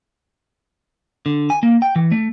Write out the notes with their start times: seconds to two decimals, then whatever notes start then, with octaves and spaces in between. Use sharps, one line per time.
1.26 D3
1.50 G#5
1.63 A#3
1.82 G5
1.96 E3
2.11 A3